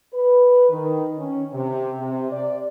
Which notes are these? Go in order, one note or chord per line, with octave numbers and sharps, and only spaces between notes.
B4
D#3
C#4
C3
C3
D5